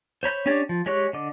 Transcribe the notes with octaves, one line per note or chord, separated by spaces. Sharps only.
C5 C#5 B5 G6
C#4 D4 G4 C#5 D5
F3
G#3 G4 C#5 C#6 F#6
D3 D#5 D6